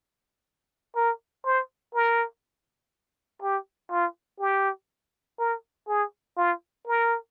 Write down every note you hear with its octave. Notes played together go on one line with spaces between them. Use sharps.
A#4
C5
A#4
G4
F4
G4
A#4
G#4
F4
A#4